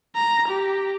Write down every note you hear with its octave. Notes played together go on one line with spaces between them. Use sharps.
A#5
G4